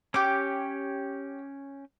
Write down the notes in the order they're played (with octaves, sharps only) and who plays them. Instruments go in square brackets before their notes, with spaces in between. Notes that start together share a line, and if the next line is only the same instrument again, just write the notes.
[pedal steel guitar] C#4 C#5 G5 [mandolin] G4 D6